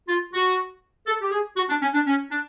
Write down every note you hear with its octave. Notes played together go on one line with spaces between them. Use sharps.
F4
F#4
A4
G4
G#4
F#4
D4
C#4
D4
C#4
D4